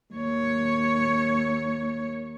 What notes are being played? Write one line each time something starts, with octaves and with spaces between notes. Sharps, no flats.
D#2 C#5